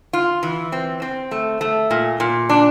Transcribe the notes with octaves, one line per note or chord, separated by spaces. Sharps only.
F4
E3
C4
C4
A3
A3
A#2
A#2
D4